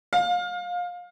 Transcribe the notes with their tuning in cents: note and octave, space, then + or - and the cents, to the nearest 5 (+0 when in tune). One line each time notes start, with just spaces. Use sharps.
F5 +25